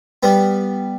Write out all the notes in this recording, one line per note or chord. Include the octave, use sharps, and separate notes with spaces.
G3 B3